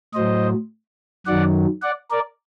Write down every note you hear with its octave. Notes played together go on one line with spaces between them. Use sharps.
A2 F#3 C5 D#5
F#2 D#3 F#3 D5 F#5
D5 F#5
A#4 D5